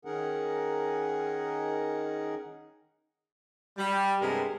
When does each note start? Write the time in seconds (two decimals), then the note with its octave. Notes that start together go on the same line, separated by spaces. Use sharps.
0.05 D#3 C#4 D#4 G#4 A#4 F#5
3.78 G3
4.21 G2 C3 G#3 B3 A4 A#4